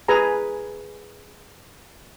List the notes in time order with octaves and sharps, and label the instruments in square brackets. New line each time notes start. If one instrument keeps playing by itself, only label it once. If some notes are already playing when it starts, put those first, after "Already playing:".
[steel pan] G#4 B4 G#5 A#5